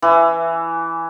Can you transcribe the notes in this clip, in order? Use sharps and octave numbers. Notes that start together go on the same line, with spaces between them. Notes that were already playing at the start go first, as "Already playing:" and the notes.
E3